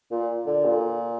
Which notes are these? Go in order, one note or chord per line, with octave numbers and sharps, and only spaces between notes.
A#2
D3
A#2